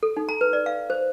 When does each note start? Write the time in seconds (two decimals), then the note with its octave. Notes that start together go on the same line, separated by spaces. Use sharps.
0.03 A4
0.17 D#4
0.29 A#5
0.41 B4
0.53 D5
0.66 F5
0.90 C5